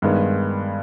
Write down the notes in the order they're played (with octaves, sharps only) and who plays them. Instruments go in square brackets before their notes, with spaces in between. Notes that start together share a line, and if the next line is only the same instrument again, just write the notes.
[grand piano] G2 D#3 G#3 B3